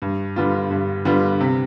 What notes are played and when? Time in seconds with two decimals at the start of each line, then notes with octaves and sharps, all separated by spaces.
0.02 G2
0.36 D3 G3 B3 F4
0.70 G2
1.05 D3 G3 B3 F4
1.40 C3